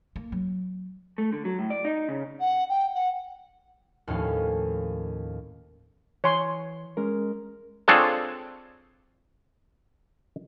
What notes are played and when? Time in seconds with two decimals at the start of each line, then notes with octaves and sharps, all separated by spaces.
0.16 A#3
0.32 F#3
1.18 A3
1.33 D3
1.45 F#3
1.59 A2
1.70 D5
1.85 D#4
2.09 C#3
2.40 F#5
2.69 G5
2.95 F#5
4.07 D#2 A2 F3 C#4 F5
6.24 E3 C#5 G#5 C6
6.97 G#3 C#4 A#4
7.88 C4 D4 F4 G#4 A4 C#5